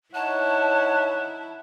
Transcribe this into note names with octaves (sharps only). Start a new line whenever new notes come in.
D#4 E4 C#5 F#5 A5